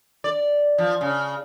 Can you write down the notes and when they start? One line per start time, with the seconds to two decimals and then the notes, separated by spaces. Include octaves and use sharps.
0.24 D5
0.78 F3
1.01 C#3